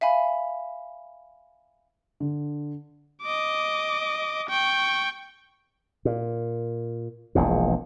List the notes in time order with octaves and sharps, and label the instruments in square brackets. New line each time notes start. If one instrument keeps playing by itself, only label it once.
[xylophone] E5 F5 G#5 B5
[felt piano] D3
[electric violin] D#5 D6
G5 C#6
[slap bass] A#2
E1 A#1 E2 A#2